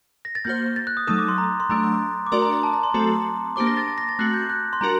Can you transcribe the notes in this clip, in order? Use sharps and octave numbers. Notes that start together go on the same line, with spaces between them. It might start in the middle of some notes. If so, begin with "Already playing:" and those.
A#6
A6
A#3 F#4 C5 G6
A6
F#6
D#6
F#3 A3 D#4 A4 D#6
D6
C6
A#5
C6
F#3 A3 D4 A#5
D6
A3 D4 F#4 A#4 D5 C6
A#5
A#5
A5
A#5
C6
F#3 A3 C4 F#4 A4
A#3 D4 G4 C5 D6
A#6
A6
A6
A#6
A6
A3 C4 F#4 F#6
G6
F#6
C6
G3 D4 F#4 A#4 A#5